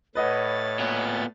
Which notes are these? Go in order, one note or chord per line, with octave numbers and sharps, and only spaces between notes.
A2 B4 C#5 D#5 F#5 A6
A#2 B3